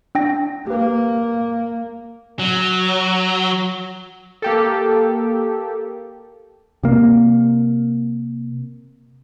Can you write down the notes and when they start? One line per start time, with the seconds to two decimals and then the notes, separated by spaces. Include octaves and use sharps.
0.15 D4 G5 A#6
0.67 A#3 G4 B4
2.39 F#3
4.42 A#3 G4 A4
6.83 C3 A#3